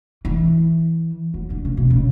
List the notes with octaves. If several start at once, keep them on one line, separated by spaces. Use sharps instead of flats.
E3
F#3
D3
C#3
B2
C#3